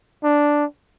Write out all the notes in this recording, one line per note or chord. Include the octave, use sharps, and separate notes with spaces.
D4